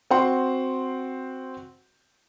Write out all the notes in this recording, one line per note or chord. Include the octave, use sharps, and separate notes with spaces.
C4 F#4 F#5 G5 C6